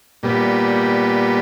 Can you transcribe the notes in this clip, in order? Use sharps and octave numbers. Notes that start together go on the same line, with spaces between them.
A#2 G3 B3